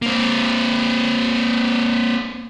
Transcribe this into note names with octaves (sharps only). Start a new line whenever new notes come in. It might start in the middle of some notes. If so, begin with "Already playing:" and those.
A#3 C4